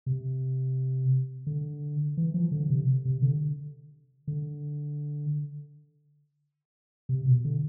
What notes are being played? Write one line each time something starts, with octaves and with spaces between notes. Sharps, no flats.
C3
D3
E3
F3
D3
C3
C3
D3
D3
C3
B2
D3